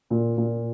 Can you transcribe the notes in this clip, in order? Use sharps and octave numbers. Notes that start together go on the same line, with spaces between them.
A#2
A#2